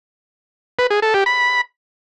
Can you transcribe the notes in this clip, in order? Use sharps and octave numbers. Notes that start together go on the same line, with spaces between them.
B4
G#4
A4
G4
B5